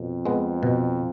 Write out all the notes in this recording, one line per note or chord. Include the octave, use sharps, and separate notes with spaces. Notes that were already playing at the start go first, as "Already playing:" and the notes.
Already playing: F2 B2
G#3 B3
B2